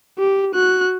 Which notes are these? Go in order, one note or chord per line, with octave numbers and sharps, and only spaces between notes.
G4
F#4 F#6